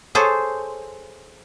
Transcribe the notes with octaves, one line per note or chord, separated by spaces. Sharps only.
G#4 A4 C5 C#5